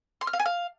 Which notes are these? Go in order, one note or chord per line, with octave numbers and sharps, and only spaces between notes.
C6
F6
F5
G#5
F5